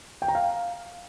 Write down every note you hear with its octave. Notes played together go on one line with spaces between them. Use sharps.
G5
A#5
F5